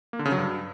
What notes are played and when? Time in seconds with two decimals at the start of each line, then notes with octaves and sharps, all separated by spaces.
0.13 A#3
0.19 D3
0.25 C#3
0.32 F#3
0.38 G2